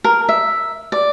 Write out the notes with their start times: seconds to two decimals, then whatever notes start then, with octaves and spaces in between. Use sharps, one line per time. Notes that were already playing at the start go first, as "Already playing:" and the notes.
0.04 A#4
0.29 E5
0.92 D5